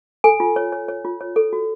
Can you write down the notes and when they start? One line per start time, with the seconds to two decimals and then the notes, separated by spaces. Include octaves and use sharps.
0.24 A4 G#5
0.40 F4
0.56 C#5
0.72 C#5
0.88 C#5
1.05 F4
1.21 C#5
1.36 A4
1.53 F#4